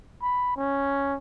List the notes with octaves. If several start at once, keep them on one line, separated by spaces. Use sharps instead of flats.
B5
C#4